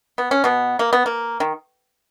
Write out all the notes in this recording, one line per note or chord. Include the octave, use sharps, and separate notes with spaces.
B3
C#4
B2 B3
A#3
B3
A#3
D#3